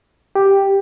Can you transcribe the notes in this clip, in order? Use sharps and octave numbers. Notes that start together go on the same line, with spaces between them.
G4